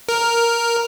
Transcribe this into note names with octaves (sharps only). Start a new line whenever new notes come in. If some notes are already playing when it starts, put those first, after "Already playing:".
A#4